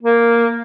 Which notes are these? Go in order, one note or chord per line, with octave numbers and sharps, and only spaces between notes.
A#3